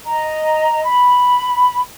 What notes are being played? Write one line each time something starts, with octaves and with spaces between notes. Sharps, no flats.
D#5 A#5
B5